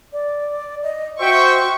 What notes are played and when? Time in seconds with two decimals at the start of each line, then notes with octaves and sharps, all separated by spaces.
0.13 D5
0.83 D#5
1.20 F#4 C5 E5 G5 C#6